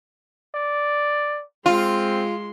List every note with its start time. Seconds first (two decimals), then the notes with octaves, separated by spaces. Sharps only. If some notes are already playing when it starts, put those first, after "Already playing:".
0.55 D5
1.66 G#3 C4 F4 C6